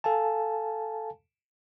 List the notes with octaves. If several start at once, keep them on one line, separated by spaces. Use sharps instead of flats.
A4 F5 G#5 A5